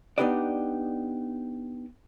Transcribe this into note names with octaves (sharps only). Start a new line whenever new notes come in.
B3 D4 D#4 G4 B4 D5